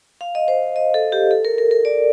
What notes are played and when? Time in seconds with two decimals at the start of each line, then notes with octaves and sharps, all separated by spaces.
0.21 F5
0.35 D#5
0.48 C5
0.76 D#5
0.94 A4
1.12 G4
1.31 A4
1.45 A#4
1.58 A#4
1.71 A#4
1.85 D5